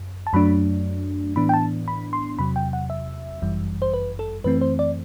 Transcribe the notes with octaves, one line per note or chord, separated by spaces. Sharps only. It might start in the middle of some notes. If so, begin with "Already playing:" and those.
Already playing: F#2
A5
F#2 F#3 A3 D4 B5
A2 E3 B3 D4 B5
G5
A5
B5
C6
E2 C3 F#3 B5
G5
F#5
E5
G1 F#2 E3 G3
C5
B4
A4
F#2 E3 A3 C4 B4
C5
D5